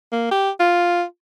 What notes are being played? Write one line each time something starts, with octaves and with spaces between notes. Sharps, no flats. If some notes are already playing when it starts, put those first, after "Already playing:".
A#3
G4
F4